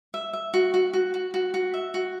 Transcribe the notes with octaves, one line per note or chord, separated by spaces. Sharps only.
E5
E5
F#4
F#4
F#4
F#4
F#4
F#4
E5
F#4